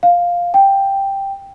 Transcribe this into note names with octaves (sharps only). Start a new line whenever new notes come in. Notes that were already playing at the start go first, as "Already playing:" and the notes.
F5
G5